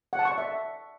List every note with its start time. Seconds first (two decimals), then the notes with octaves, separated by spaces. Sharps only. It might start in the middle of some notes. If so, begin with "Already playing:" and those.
0.13 F#5
0.19 A5
0.25 C#6
0.32 D5
0.38 E5